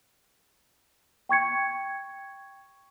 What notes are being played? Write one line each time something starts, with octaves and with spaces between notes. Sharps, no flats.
G5 C#6 G#6 C#7